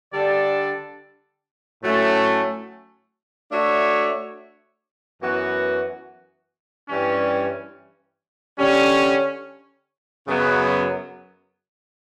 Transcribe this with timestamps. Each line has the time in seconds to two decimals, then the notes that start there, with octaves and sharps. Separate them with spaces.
0.13 D3 G3 D4 A4 D5
1.83 A2 F#3 A3 C#4
3.51 A3 D4 F#4 C#5 E5
5.21 F#2 E3 B3 F#4
6.89 G2 E3 G3 C#4
8.58 D3 G3 C#4
10.28 F#2 C#3 F#3 B3